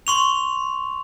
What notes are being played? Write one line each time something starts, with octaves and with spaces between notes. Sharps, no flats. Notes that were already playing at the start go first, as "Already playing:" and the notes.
C6 C#6 F7